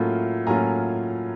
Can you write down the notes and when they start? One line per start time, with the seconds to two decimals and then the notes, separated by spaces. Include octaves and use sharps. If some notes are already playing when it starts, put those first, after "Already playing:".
Already playing: A2 F#3 A#3 C#4 F4
0.47 A2 F#3 A#3 C#4 F4 G#5 A#5